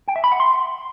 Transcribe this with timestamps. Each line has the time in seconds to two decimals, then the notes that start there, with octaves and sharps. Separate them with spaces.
0.08 G5
0.16 E5
0.24 B5
0.32 F#5
0.40 C6